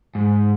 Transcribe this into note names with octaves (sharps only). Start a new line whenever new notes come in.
G#2